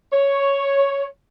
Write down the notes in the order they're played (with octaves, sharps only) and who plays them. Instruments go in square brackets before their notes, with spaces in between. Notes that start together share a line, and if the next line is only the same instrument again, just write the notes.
[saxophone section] C#5